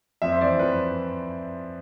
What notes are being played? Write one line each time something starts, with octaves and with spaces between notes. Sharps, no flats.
F2 E5
C5
E3 D5
F2 B4